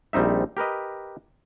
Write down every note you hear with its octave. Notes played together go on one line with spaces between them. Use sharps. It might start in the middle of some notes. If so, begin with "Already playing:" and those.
A#1 G3 C4 D#4 E5
G4 A#4 B4 D#5